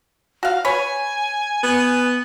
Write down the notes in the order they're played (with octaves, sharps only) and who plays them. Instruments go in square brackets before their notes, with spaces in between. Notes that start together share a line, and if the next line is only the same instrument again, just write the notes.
[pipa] F#4 F5
[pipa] B4 C#5 [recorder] G#5
[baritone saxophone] B3